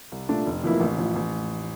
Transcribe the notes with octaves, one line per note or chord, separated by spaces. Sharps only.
C2
A#2 A3 D4
F1
F2 E3 A#3 E4
A1
A2 F3
A1